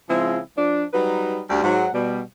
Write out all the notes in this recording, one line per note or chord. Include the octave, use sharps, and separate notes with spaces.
C#3 F3 G#3 C4 E4 F4
F3 D4
F#3 G3 D#4 B4
D2 G3
G#2 F#3 F#5
B2 G3